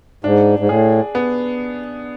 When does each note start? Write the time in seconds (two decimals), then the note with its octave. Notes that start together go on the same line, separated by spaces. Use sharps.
0.24 G#2 D4
0.59 G#2
0.69 A2 G#4
1.15 B3